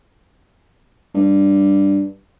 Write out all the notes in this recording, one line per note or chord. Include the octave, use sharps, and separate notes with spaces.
G2